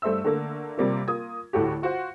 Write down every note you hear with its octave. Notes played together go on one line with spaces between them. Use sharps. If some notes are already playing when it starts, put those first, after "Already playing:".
G2 A3 C5 E5 E6
D3 A3 A#3
C3 G3 A#3 C4 F4
A#3 F4 D#6 G#6
D2 A2 A3 F#4 G4
F4 F#4 C5 F#5